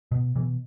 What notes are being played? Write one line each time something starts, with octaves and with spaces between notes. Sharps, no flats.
B2
B2 E3